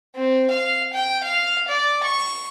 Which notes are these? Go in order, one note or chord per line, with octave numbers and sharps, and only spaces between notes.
C4
F5
G5
F5
D5
C#6